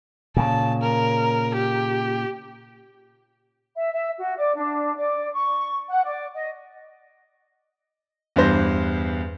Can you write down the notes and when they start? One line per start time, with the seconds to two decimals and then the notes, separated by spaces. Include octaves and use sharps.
0.37 A#2 C#3 A5
0.82 A#4
1.55 G4
3.77 E5
3.92 E5
4.19 F#4
4.38 D5
4.56 D4
4.96 D5
5.34 C#6
5.88 F#5
6.04 D5
6.34 D#5
8.36 E2 G2 E3 C5 A#6